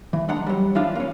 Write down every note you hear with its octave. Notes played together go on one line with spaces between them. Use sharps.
E3
G#3 D4 F#5 A#5
F#3 G3
E3 F3 D4 F4
A#3 C#4